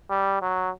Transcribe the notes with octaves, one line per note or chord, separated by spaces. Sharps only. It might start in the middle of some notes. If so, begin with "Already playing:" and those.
G3
F#3